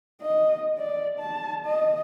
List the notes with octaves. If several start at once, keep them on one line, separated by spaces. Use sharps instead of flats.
D#5
D5
A5
D#5